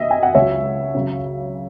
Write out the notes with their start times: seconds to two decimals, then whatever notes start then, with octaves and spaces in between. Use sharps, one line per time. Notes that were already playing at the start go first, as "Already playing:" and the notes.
Already playing: B2 A#3 D#5 E5
0.11 G#5
0.23 F#5
0.35 C#2 C#3 F#3 C#5 E5
0.94 F#2 C#3 F#3 C#4